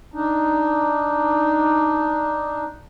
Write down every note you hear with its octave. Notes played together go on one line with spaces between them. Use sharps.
D4 D#4